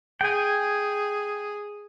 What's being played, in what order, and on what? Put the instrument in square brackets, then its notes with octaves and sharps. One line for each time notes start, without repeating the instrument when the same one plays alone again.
[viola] G#4 [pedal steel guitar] G5 G#5